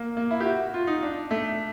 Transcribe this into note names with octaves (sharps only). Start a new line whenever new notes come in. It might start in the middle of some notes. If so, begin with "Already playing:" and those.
Already playing: A#3
A#3
E4
G4
F#4
F4
D#4
D4
A3